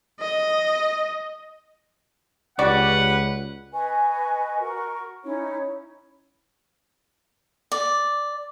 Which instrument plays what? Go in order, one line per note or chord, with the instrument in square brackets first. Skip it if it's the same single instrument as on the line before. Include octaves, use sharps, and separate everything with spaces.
[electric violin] D#5
[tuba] C#2 [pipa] F#4 D5 [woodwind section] G4 B4 [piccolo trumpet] F#5
[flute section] B4 D#5 G#5 C#6
F#4 A#4 C#6
C#4 D#4 E4 C#5
[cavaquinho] D5